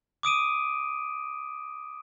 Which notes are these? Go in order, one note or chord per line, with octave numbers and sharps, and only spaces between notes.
D6 D#6 D7 D#7